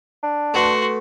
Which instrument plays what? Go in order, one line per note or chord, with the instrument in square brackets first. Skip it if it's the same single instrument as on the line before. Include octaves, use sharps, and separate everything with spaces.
[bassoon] D4
[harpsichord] A3 B3 [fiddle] F#4 C6